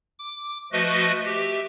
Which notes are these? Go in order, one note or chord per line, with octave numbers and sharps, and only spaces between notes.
D6
F3 A3 F#4 B4 D#5
G4 E5